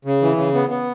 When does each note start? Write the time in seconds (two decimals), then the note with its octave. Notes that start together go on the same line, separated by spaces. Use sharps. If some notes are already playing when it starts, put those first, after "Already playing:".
0.05 C#3
0.22 E3
0.37 C#3
0.54 B3
0.70 B3